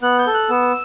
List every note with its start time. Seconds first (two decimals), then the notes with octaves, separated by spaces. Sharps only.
0.02 B3 F#6
0.19 G6
0.27 A4
0.34 F#6
0.49 B3 E6